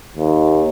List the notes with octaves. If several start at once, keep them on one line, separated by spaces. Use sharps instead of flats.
D#2